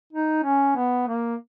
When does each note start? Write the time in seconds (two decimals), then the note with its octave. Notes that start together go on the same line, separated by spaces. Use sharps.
0.13 D#4
0.44 C#4
0.76 B3
1.07 A#3